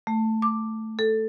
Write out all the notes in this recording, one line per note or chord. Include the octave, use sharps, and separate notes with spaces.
A3
D6
A4